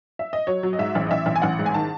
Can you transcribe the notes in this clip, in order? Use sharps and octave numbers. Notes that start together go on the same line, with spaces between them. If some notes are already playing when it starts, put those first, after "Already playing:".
E5
D#5
F#3 C#5
F#3
D#5
G#2 E5
A1
D#5
A1 E5
A1
G#5
A1 F#5
G#2
G#5
D#3 A5